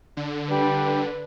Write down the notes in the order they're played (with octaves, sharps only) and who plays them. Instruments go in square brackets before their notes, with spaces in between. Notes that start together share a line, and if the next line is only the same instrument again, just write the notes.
[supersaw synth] D3
[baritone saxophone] G3 [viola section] D4 B4